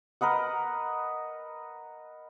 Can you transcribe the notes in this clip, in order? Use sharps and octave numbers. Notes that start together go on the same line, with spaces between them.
A#4 B4 D#5 F#5